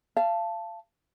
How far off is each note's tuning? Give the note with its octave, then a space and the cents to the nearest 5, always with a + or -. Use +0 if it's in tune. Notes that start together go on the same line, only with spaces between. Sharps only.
F5 -30 A5 +0